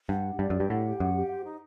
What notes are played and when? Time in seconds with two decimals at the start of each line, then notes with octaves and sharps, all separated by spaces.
0.09 G2 F#5
0.25 G4
0.39 G2 D5
0.50 F#2
0.55 G4
0.60 G2
0.69 A2 F#5
0.85 G4
1.00 F#2 F#5
1.15 G4
1.30 C5
1.44 D#4